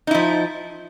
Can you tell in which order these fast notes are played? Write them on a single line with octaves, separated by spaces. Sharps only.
D#4 E4 F3